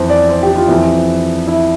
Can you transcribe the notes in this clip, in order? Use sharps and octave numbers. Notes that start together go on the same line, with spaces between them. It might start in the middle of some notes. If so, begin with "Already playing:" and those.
Already playing: F2 E3 C5
D5
C5
G4
F4
F2 E3 E4
E4